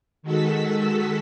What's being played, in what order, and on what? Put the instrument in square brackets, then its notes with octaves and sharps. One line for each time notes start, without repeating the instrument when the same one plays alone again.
[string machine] D#3 G#3 F#4 A4 E6 B6